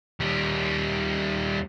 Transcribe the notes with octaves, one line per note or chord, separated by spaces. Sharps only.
D#2 G3